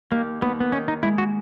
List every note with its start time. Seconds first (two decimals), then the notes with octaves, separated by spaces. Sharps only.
0.11 D#2 A#3
0.42 D#2 B3
0.60 B3
0.72 D#3 C#4
0.88 D#4
1.03 G#3 E4
1.18 F#4